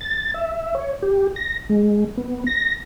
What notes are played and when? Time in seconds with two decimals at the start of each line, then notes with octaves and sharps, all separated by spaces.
0.01 A6
0.34 E5
0.75 C#5
1.03 G4
1.36 A#6
1.69 G#3
2.18 B3
2.47 A#6